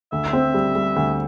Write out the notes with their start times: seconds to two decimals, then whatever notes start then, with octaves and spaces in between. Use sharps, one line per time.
0.12 D2 E5
0.33 C4
0.54 G3
0.75 G3
0.96 D2